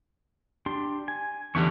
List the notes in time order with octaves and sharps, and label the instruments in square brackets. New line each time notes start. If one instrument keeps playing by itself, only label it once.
[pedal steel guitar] D4 G4 C6
G#5
[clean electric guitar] E2 D3 G3 [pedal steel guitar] E5 C#6